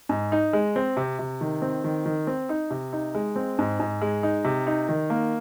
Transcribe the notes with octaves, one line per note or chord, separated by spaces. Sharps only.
G#2
D#4
G#3
C4
C3
C3
D#3
C4
D#3
D#3
C4
D#4
C3
D#4
G#3
C4
G#2
G#2
G#3
D#4
C3
D#4
D#3
A#3